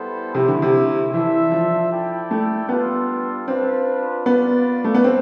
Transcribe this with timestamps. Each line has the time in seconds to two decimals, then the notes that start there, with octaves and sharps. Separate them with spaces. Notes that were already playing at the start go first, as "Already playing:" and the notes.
Already playing: G3 B3 E4 A4 C5
0.35 C3 A3 C4 E4
0.48 D3
0.62 C3
1.12 E3 D4 A4 C5 E5
1.52 F3
1.91 E4 A4 D5 G5
2.31 A3
2.69 G3 B3 D4 F4 A4
3.48 C4 D4 F4 B4
4.26 B3 F4 B4 D5 F5
4.84 A3
4.94 B3
5.04 C4